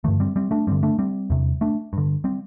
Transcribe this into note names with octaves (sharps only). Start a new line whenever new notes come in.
G2 D3 E3 A3
G3 C4
G3 C4
A3 D4
G2 D3 G3 C4
A3 D4
G3 C4
E2 C3
A3 D4
G2 D3
G3 C4